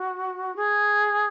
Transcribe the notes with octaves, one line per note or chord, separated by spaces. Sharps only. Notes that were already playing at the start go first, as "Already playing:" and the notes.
Already playing: F#4
G#4